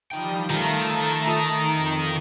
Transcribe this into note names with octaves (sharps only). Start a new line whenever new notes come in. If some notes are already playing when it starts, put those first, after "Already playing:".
F3 G3 D#4 G5
D#3 F3 A3 F4 A5 A#5
D#4 D#5
F2